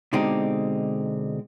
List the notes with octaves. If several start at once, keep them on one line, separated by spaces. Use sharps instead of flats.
B2 D3 G#3 C4 D#4 G4